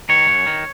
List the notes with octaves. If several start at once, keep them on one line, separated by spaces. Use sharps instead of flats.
D#3 C#5
F#2
D#3